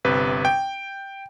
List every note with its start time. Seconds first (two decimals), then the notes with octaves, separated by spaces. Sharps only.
0.05 G1 C3 B4
0.45 G5